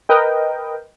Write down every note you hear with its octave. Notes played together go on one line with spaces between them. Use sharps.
A#4 B4 D#5 G5